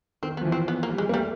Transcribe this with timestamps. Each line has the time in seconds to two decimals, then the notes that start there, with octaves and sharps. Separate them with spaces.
0.23 D#3 C4
0.37 B3
0.41 F3
0.45 E3
0.52 C4
0.68 B3
0.83 A#3
0.91 G3
0.98 G#3
1.09 A#3
1.14 G3 A3